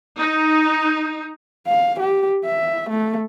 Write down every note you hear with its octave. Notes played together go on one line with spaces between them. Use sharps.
D#4
F5
G4
E5
A3